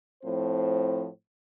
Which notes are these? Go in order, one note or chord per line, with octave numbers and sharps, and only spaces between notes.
A2 F3 C4 C5